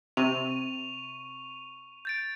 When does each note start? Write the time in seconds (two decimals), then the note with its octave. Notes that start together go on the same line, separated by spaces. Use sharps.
0.17 C3 C#6 D#7 F7
2.05 G6 A6 D7